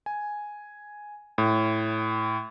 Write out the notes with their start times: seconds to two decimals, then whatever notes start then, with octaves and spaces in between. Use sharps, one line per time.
0.06 G#5
1.38 A2